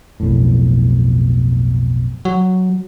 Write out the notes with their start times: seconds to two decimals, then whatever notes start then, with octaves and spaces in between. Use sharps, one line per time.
0.20 B1 F2 A2
2.25 F#3